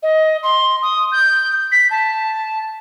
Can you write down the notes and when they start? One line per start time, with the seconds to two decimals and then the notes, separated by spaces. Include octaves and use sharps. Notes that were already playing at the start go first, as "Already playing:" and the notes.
0.03 D#5
0.43 C6
0.83 D#6
1.12 G6
1.72 B6
1.91 A5